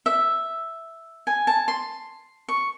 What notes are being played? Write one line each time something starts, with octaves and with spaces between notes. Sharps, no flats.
E5
G#5
A5
C6
C#6